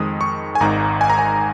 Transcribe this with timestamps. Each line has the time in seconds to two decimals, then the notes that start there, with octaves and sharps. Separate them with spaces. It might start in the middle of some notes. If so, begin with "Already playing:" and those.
Already playing: F2 D#3 G#3 D#6
0.21 C#6
0.55 G#5
0.60 G#1 G#2 D#3 A#5
1.01 G#5
1.10 A#5
1.19 G#5